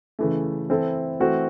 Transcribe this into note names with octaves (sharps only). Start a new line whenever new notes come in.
C#3 E3 A3
E3 C4 E4 A4
E3 A3 C4 F#4